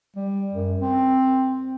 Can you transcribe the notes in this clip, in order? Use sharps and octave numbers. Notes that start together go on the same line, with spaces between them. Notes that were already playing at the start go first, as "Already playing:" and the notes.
G3
F#2
C4